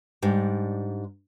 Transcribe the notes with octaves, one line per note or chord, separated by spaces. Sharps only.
G#2 G3 D4